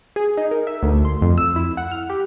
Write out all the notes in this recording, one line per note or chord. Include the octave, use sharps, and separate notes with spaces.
G#4
D#4
A#4
E5
D2
C6
F2
E6
E4
F#5
F6
G4